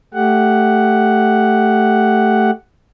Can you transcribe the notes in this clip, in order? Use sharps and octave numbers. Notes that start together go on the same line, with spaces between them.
A3 G4 F#5